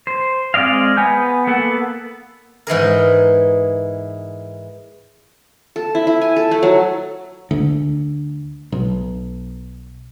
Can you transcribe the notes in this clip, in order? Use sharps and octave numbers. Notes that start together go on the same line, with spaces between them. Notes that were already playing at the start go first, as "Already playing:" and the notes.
C5
G#3 C4 D5 D#5 F5
B3 G#5 G6
A#3 B3 A4 F#5
G#2 E3 G#4 A#4
A4
E4
E4
G#5
A4
A3
F#3
D2
B1